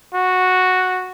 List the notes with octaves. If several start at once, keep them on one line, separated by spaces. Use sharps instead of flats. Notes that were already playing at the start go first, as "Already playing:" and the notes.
F#4